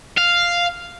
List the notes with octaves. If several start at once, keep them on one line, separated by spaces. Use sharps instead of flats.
F5